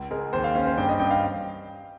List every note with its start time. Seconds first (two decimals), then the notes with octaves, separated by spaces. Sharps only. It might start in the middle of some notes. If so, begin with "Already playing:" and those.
Already playing: C#2
0.11 G#3 A#4
0.33 D#2 C5
0.44 F5
0.55 C#4 F5
0.67 C5
0.78 G2 G5
0.89 D#5
1.00 G2 G5
1.11 F5